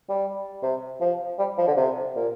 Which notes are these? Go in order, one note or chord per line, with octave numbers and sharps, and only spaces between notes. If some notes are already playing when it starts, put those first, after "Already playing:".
G3
C3
F3
G3
F3
D3
C3
A#2